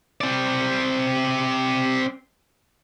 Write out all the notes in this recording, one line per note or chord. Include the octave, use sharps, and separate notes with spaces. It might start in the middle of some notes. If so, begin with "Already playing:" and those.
C4 D5